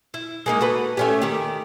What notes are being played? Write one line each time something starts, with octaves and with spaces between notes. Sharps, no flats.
E4
G#3 A#3 D#4
F#4 A4 B4
A3 C#4 G4
D#3 G4